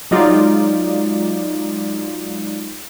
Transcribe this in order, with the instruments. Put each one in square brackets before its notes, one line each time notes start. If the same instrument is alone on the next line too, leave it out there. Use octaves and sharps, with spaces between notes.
[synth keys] F#3 G#3 D#4 F4 D5